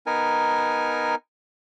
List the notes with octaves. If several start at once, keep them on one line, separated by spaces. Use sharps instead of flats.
B3 D#4 A#4 G#5